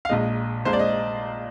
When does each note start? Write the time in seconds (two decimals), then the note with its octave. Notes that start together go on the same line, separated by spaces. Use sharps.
0.05 F5
0.09 A#1 A#2 G#3 D#5
0.65 A#1 A#2 G#3 C5
0.73 D5
0.79 D#5